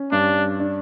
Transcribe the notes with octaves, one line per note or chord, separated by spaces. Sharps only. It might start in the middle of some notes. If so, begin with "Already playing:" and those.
Already playing: C#4
G2 D4
D4